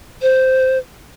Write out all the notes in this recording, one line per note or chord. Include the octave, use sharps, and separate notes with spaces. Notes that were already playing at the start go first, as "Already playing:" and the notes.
C5